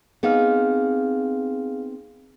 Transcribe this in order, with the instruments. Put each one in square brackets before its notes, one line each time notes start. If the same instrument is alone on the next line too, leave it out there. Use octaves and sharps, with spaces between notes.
[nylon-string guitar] B3 C4 D#4 [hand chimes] G#4 F5 F6